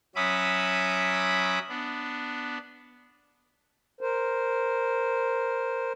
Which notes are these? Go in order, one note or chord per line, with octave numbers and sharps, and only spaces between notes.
F#3 C#4 E5 B5 D6 D#6
B3 D4
A#4 C5